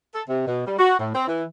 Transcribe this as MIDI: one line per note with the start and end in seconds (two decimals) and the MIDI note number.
0.15 0.23 69
0.29 0.47 48
0.47 0.64 47
0.67 0.77 55
0.79 0.99 66
1.00 1.14 45
1.15 1.26 60
1.28 1.44 52